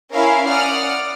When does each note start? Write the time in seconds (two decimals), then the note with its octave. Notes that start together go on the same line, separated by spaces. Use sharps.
0.14 C#4 E4 A#4 E5 F5
0.48 D5 F#5 D#6 F6